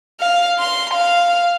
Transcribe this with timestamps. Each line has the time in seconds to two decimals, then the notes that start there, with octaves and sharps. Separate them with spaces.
0.20 F5
0.59 C6
0.94 F5